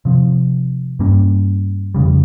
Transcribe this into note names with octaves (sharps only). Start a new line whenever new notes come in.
C3 F3 C4
G2 G3 A#3 C#4
F2 C#3 G3